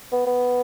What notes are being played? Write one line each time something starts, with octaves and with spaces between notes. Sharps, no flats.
B3
B3